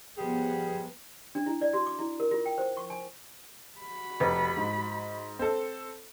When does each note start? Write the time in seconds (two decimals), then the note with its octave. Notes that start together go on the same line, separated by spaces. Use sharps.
0.17 F3 G3 B3 G#4
1.35 D4
1.46 E4
1.61 D5
1.73 F#4
1.86 D6
1.99 E4
2.20 A#4
2.31 F4
2.46 G5
2.58 C5
2.77 C#6
2.90 G#5
3.80 F#4 B5
4.20 F1 B4
4.57 G#2
5.39 C4 A4